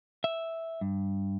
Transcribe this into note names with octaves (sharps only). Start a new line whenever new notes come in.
E5
G2